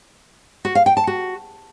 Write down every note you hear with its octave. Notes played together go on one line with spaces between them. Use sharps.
F#4
F5
G5
A5
F#4